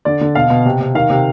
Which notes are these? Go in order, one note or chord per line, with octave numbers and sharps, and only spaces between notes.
D3 D5
D3
B2 F5
B2
C3
C3
D#3 F5
C3